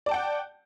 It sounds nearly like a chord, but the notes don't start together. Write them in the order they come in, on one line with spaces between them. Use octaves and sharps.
D5 A5 G5 F#5